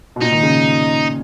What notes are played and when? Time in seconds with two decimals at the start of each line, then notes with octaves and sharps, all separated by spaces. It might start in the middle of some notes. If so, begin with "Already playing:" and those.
0.16 B2
0.21 A#2 D#4
0.32 D#3
0.43 C#3